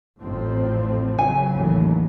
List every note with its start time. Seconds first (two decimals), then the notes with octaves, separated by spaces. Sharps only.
0.20 A1 F2 A2 F3 C4
1.19 C#3 F#3 G#5
1.54 A1 D#2 E3